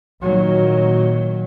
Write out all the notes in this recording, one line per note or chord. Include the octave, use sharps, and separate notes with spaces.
A#2 D#3 F#3